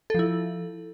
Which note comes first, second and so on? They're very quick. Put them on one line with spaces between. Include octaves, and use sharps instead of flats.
A4 F3 E4